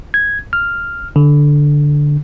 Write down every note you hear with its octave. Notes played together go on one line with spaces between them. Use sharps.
G#6
F6
D3